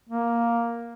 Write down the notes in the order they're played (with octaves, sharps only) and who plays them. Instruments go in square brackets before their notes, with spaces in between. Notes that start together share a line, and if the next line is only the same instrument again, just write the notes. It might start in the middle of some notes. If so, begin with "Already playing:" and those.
[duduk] A#3